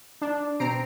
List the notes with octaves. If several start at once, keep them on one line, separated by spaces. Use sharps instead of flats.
D4
B2 C4 A#5 C7 D7